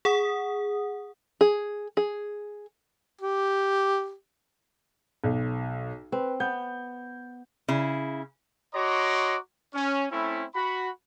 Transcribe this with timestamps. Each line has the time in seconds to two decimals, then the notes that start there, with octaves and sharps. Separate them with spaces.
0.05 G#4 F#5 D#6
1.41 G#4
1.97 G#4
3.21 G4
5.24 B1
6.12 C4 B4
6.40 B3 G6
7.68 C#3 E4
8.74 F#4 C#5 D#5 A#5 C6 D6
9.74 C#4
10.11 A3 C4 C#4 E4
10.55 F#4 B5